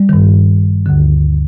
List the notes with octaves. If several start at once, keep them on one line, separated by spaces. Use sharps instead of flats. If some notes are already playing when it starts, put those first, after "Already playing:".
Already playing: G3
G2 D#3
D2 D3